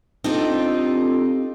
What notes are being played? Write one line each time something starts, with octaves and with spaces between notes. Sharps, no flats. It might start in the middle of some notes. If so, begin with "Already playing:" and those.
C4 D4 D#4 F4 G4 A4